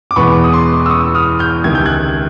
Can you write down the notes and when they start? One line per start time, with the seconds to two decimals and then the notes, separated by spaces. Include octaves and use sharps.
0.11 D6
0.16 E2 B2 G#3 B3 B5 C#6
0.44 D#6
0.53 C6 D6
0.86 E6
0.90 C#6 D#6
1.15 D#6 F6
1.39 F6 G6
1.64 C#2 C3 D#3 G#6
1.75 G6
1.86 F#6 G#6